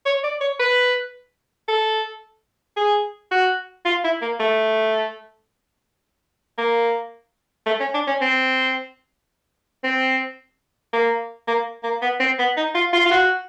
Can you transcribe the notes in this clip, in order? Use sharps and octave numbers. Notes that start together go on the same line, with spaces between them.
C#5
D5
C#5
B4
A4
G#4
F#4
F4
E4
A#3
A3
A#3
A3
C#4
D4
C#4
C4
C4
A#3
A#3
A#3
B3
C4
B3
D#4
F4
F4
F4
F#4